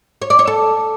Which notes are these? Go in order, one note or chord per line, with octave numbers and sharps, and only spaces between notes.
C#5
D5
C#5
A4